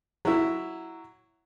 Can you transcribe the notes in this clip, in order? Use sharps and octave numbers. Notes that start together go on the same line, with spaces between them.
F#3 E4